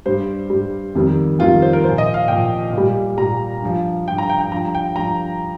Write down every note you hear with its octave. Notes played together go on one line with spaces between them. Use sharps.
G2 G3 C5
G2 G3
F2 D#3 G3
F2 D#3 G3 F4
C5
A#4
A#2 F3 C5
D#5
F5
A#2 F3 G5
A#2 G3
A#2 G3 A#5
G2 F3
G2 F3 G5
A#5
G5
G5
G2 F3 A#5
G5
G2 F3 A#5